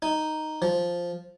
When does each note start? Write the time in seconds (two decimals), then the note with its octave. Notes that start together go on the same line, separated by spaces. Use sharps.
0.02 D#4
0.62 F3